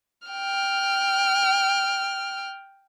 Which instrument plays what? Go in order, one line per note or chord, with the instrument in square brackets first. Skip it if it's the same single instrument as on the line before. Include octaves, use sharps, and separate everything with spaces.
[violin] G5 F6